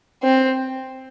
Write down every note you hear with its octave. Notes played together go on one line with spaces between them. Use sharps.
C4